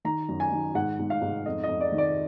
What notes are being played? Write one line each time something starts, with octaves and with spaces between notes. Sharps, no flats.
D#3 A#5
F#2
G#5
D#3
G#2 F#5
G#2
F5
G#2
F2 D#5
F2 D#5
D5
D#3
D5